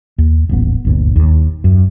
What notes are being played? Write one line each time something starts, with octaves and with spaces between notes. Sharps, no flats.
D#2
D#1 A1 B3
G1 D2 A#2
D#2
F#2